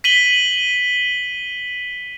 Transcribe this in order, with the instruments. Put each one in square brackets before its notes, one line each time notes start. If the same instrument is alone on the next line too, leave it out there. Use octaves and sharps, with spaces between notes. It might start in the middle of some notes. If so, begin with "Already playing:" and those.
[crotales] B6 D#7 F#7 G7